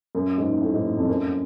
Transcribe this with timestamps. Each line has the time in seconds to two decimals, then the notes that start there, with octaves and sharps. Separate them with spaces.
0.15 F#2
0.38 G#2
0.62 A2
0.74 G#2
0.97 F2
1.08 F#2